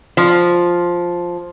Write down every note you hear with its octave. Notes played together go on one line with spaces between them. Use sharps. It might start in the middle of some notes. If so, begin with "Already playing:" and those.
F3